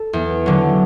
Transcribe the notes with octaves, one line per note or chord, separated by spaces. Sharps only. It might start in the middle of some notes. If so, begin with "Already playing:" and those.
Already playing: A4
E2
D3 F#3